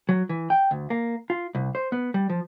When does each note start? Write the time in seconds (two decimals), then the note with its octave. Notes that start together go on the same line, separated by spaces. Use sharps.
0.09 F#3
0.29 E3
0.50 G5
0.71 D2
0.90 A#3
1.30 F4
1.55 C2
1.75 C5
1.92 B3
2.14 G3
2.30 F3